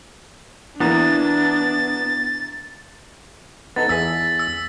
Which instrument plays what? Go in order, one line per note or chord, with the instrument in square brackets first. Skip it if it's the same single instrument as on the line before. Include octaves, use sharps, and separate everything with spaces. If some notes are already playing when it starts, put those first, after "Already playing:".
[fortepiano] E2 E3 A#3 [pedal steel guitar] B3 [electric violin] D4 [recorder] A6
[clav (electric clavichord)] B3 D#4 A4 [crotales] A6
[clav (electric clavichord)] E2 G#4 [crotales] E6 B6
[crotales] E6